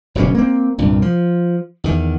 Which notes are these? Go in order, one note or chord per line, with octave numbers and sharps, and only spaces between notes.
F#1 B2 D3 C#4
A#3 C4
C2 G2 A#2
F3
E2 D#3